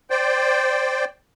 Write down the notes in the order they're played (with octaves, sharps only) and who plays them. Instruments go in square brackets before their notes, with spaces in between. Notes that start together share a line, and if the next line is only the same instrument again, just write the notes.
[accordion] C5 D5 G5